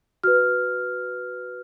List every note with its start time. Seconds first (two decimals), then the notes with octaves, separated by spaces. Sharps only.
0.24 F#4 B4 F6